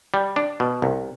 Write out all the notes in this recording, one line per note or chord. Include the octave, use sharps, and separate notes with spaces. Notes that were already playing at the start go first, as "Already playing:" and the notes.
G3
D4
B2
C2